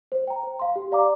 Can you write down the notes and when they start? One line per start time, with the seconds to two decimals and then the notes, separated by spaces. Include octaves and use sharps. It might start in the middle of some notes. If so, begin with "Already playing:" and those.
0.12 C5
0.27 G5 A#5
0.43 C5
0.59 F5 C6
0.76 G4
0.92 D5 F5 A#5 D6